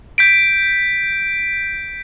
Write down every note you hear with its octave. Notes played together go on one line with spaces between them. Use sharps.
G6 B6 D7